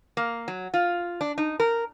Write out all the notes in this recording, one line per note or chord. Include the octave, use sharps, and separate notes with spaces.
A#3
F#3
F4
D4
D#4
A#4